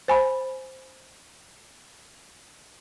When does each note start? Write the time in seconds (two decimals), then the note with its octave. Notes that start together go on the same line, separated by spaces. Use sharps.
0.08 C5 G#5 B5